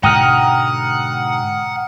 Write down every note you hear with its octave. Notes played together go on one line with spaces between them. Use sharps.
G#2 B2 D3 F#5 G5 A#5 D#6 F6